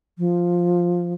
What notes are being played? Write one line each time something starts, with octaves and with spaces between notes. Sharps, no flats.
F3